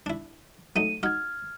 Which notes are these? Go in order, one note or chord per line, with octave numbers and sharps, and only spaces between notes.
D4 E4
F#3 A3 D#4 D#7
D#4 F#4 F6 G#6